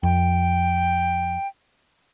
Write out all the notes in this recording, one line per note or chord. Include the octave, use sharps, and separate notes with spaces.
F2 G5